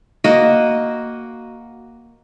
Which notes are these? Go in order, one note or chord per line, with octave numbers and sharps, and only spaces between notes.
A#3 F#4 D#5